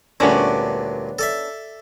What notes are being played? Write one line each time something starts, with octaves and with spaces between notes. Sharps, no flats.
D2 G2 A#2 B3 C#4 D4
A4 D5 E5